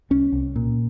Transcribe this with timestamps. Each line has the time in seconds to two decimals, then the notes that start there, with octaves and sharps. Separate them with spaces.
0.10 C2 C#4
0.32 C2
0.56 A#2